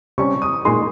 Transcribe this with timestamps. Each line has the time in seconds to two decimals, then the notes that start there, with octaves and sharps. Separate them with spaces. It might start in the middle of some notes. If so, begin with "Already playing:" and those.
0.18 C3 G3 C#4 C#6
0.42 D#6
0.65 A#2 G#3 D#4 G#4 C6